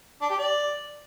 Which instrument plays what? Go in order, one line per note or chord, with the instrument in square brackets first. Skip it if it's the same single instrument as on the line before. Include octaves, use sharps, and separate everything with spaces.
[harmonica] D4
G4
D5